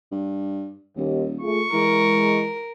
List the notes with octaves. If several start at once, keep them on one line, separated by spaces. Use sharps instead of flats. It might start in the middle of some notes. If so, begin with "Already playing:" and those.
G2
D#1 D#2
A3 F4 G#4 C#6
E3 G#3 A#4